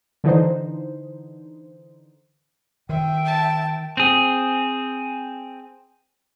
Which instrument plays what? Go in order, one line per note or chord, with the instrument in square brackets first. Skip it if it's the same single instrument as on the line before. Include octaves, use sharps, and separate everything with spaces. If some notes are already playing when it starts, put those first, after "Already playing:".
[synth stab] D3 E3 D#4 C5
[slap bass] D#3 [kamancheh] E5 [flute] G5
[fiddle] A5
[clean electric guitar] C4 G#4